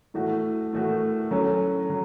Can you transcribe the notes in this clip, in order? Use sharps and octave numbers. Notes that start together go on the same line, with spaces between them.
A2 E3 A3 F#4
A2 E3 A3 F#4
F#3 C#4 A4
F#3